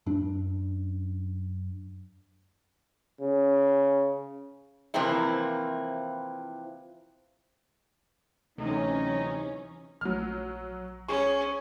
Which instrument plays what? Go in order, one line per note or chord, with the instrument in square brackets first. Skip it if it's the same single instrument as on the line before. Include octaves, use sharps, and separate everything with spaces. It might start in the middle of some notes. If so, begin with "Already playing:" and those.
[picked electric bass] F#2 D4
[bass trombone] C#3
[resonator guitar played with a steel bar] C3 E3 F3 A#3 C4 E4
[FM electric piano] D2 A3 [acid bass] C3 [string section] E3 F#3 C#4 [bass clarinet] D#4
[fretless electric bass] A#1 A3 [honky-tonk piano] F#3 F6
[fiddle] C#4 [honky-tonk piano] G#4 C#6